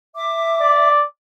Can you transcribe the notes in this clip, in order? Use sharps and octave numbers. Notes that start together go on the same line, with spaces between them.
E5 D6
D5